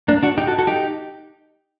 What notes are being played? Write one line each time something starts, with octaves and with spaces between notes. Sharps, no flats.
A#3 D4
D4 F#4
D#4 G4
F#4 A4
F#4 A4
D#4 G4